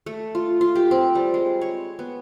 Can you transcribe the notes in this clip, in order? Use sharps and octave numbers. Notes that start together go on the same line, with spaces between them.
A3
F4
F4
G4
C4
G3
G#3
C#5
B3